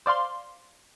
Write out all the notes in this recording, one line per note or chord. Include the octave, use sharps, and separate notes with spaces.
C5 D5 F5 C6